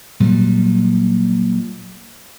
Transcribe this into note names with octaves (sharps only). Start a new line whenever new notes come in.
A#2 F#3 G3